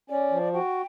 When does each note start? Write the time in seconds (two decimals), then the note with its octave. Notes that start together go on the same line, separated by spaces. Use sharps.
0.09 C#4 D5
0.31 F3
0.54 F#4 G5